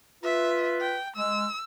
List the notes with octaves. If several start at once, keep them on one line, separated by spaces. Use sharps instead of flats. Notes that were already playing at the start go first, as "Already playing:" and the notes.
F4 B4 E5
G5
G#3 E6